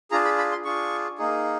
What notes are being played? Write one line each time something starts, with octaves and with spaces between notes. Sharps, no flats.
D4 F4 G#4 A#5
B5
B5
C6
D4 F4 G#4 C#6
A#3 D#4 G#4